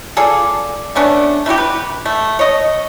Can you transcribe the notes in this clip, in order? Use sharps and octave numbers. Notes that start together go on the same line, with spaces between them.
F4 G#4 A4 D5
A3 B3 C#4 D4
A3 E4 F#4 G4
B4
A3
C#5 D#5